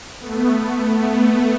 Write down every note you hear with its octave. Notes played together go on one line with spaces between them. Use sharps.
A3 B3
A3 B3